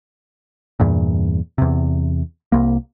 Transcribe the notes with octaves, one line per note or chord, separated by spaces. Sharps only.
E2 G2 A#2
E2 C3
C2 A#3